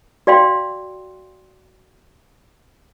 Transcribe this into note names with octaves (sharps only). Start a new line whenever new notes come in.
F#4 D5 F5 G5 C6